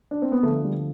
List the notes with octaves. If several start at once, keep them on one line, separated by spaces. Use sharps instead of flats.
D4
C4
B3
D2 D3 F3 A3
G3